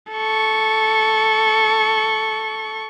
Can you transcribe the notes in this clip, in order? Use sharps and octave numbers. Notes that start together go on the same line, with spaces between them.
A4 C#6